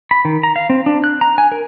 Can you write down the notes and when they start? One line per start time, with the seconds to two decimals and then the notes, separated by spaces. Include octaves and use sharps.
0.11 B5
0.25 D#3
0.43 A#5
0.56 F5
0.70 C4
0.86 D4
1.04 F#6
1.21 A#5
1.38 G#5
1.52 A#4